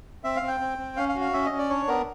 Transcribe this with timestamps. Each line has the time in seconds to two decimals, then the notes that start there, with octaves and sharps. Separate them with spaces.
0.24 C4 E5
0.36 F5
0.42 C4
0.48 G5
0.60 C4
0.78 C4
0.97 C#4 F5
1.09 F5
1.15 F#4
1.21 F5
1.33 C#4 E5
1.46 D#5
1.52 C#4
1.58 D5
1.70 D4 C#5
1.88 B3 A#4